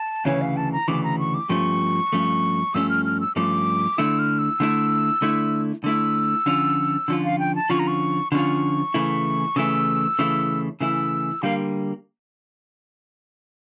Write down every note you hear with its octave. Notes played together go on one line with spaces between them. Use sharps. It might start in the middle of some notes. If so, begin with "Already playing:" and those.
Already playing: A5
D2 C#3 E3 C#5
F5
A5
A#5
D2 C#3 E3 D6
A#5
C#6
D6
G2 F3 A3 C#4 C#6
G2 F3 A3 C#4
G2 F3 A3 C#4 E6
F6
F6
E6
G2 F3 A3 C#4 D6
D3 A3 E4 E6
F6
E6
D3 A3 E4
D3 A3 E4
D3 A3 E4 E6
D3 F3 C#4 F4
D3 F3 C#4 F4
F5
G5
A5
D3 F3 C#4 F4 C#6
A#5
C#6
D3 F3 C#4 F4 C#6
C#3 E3 A3 E4
C#3 E3 A3 E4 E6
C#3 E3 A3 E4
C#3 E3 A3 E4 E6
D3 G3 A#3 F5